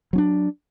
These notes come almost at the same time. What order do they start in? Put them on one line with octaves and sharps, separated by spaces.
F#3 C#4 D4